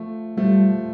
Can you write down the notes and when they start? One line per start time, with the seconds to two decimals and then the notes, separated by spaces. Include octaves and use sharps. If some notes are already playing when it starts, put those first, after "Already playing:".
Already playing: F3 A3
0.37 F3 G3 A3